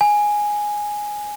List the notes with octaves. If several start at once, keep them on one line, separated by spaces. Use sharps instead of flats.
G#5